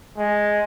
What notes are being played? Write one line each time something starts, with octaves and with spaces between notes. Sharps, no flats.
G#3